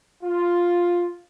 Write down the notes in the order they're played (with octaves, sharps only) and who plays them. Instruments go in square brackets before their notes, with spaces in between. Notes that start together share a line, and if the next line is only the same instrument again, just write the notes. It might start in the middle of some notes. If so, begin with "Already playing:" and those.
[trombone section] F4